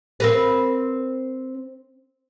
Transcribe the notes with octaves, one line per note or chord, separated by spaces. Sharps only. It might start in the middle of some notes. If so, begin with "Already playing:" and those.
C4 A#4 B4